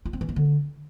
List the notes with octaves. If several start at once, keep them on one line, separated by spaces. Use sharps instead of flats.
F4
C4
E3
A#3
D3